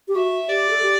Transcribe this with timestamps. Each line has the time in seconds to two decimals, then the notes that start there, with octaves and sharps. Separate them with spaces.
0.08 G4
0.15 F#4 E5
0.49 G4 D5
0.70 A4
0.83 G4